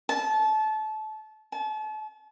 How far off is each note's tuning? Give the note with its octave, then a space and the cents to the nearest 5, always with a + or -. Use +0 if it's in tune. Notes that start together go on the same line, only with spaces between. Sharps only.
A5 -25
A5 -40